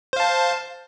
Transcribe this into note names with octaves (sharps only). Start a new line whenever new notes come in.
C5 F5 A5